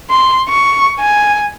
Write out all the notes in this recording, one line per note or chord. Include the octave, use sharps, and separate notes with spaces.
C6
C#6
G#5